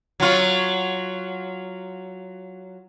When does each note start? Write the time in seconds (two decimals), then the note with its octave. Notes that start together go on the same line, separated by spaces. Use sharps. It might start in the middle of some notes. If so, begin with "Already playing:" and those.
0.20 F#3 F4